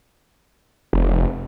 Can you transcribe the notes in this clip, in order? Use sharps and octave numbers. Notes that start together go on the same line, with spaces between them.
F1